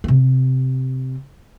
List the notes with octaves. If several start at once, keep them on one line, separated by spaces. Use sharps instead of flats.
C3 C4